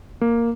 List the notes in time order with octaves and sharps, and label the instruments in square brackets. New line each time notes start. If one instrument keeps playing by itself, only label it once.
[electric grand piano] A#3